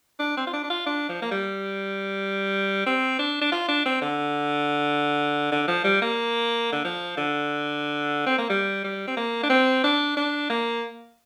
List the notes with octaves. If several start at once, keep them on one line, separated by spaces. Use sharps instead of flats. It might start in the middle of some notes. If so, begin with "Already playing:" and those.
D4
C4
F4
D4
D4
F4
D4
F3
A#3
G3
C4
D4
D4
F4
D4
C4
D3
D3
F3
G3
A#3
D3
F3
D3
C4
A#3
G3
G3
C4
A#3
D4
C4
D4
D4
A#3